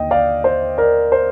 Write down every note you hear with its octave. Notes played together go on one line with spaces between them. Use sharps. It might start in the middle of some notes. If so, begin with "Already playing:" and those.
Already playing: D#2 D3 D#5 G5
D5 F5
C5
A#4 D5
C5